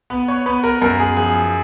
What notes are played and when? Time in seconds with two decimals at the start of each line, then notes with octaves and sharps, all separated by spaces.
0.10 B3 B4
0.28 C#5
0.46 B3 B4
0.64 A#4
0.81 F#2 A#4
0.99 G#4
1.17 F3 G#4